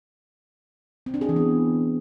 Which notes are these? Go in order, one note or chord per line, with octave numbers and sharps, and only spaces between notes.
C4
D4
G#4
E3
B3